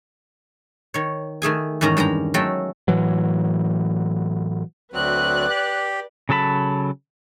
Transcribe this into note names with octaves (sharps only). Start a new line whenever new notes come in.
D#3 C#5
D#3 A3 G#4 G#5
E2 G#2 D#3 C#4 A#5
G2 G#3 G5 A#5
F#3 G#3 A3 A4 G5
A2 E3 F#3
D2 F#3 C4 B4 D5 F#6
G4
C#3 F#3 A4 A5 B5